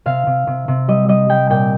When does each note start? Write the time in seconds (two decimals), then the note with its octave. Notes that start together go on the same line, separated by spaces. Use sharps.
0.06 C3 F5
0.27 C3
0.47 C3
0.68 C3
0.88 G3 D#5
1.08 G3 D#5
1.30 G3 G5
1.50 A#2 G5